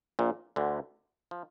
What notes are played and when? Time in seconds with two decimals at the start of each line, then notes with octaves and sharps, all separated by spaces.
0.19 A#1 A#2
0.56 D2 D3
1.31 F3